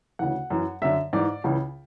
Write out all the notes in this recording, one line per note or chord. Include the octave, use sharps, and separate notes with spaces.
D2 C#3 E3 F#5
F#2 E3
F#2 D3 E5
G#2 E3 D5
C#2 C#3 E3